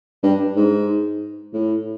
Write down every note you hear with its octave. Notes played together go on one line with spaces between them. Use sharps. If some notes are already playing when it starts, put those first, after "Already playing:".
G2
G#2
A2